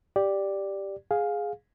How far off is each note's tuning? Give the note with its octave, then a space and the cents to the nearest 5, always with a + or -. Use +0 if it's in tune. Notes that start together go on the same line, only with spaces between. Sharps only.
G4 +0 D5 +0
G#4 +0 F5 +15